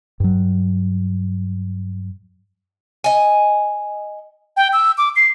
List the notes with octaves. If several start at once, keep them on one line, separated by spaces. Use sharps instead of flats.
G2 F#3
D#5 G#5
G5
E6
D6
C7